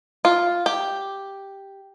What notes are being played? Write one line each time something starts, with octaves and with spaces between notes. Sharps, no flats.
F4
G4